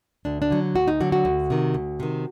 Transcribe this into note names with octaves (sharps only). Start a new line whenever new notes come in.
D2 D4
D4
D3 F#3
D2 F#4
D#4
D3 F#3 F#4
F#4
D2
C3 D#3
D2
C3 D#3